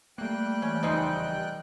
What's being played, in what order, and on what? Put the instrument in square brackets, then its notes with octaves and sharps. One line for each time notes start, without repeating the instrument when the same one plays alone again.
[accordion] G3 G5 F#6 [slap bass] A3 A#3
[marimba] E3 [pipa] C#4
[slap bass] F1 E2 C#3 [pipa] G#3 C4 D#4